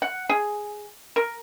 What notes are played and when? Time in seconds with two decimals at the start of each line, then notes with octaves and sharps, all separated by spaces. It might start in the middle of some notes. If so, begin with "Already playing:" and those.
0.02 F#5
0.29 G#4
1.16 A#4